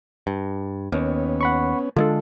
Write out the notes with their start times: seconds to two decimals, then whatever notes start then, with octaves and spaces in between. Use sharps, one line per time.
0.27 G2
0.92 D#2 B3 C#4
1.41 F#5 B5 C#6
1.96 D3 G#3 D4 F4 A4